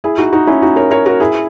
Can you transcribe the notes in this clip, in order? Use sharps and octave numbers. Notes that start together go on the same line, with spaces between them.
E4 G#4
D#4 F#4
D#4 F#4
C#4 E4
D#4 F#4
A#4 C#5
A#4 C#5
F#4 A#4
E4 G#4